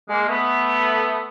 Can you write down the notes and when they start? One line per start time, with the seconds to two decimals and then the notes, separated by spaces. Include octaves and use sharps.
0.09 G#3 A#3
0.28 A3 B3